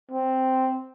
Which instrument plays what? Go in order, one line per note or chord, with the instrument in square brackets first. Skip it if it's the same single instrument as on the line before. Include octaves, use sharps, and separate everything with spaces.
[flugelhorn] C4